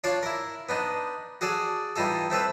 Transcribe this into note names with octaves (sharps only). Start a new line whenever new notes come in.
D4 F4 C#5 D5 F5 D6
E4 A#4
B3 D4 D#4
F#4 G#4 A4 D5
E3 G3 D#4 F4 A4
A3 C4 A4 B4